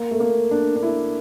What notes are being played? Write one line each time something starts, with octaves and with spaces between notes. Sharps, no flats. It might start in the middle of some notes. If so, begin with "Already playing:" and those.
Already playing: A#3
A3
A#3
D4
D4
E4